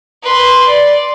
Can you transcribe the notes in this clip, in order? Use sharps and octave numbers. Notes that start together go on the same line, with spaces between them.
B4 C6
D5